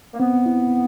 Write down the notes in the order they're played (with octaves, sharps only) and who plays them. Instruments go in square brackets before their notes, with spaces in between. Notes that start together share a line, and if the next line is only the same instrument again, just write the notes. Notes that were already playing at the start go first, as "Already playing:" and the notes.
[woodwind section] A#3
[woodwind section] B3 [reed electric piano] C4
[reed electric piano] E4